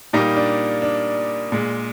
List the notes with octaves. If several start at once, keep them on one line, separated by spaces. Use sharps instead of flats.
A#2 G3 A#3 D#4
D4
D4
A#2 G#3